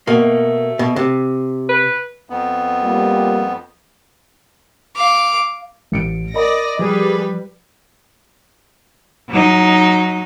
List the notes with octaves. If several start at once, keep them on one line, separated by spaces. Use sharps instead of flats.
B2 A3 A#3
B2
C3
B4
F2 B3
F3 G3 A#3
F5 D6
A1 C#7 D7
A#4 D5 D#5 B5 A#6
F3 G3 G#4 B4
F#3 D#4